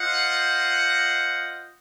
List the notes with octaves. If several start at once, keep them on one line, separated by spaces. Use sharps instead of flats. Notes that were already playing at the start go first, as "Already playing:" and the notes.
Already playing: F4 C5 D#5 F#5